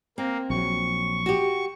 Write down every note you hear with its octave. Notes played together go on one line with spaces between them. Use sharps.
A#3 C4
A#1 F#3 C#6
F#4 G4